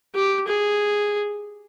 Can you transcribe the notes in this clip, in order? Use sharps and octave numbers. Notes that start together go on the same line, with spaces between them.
G4
G#4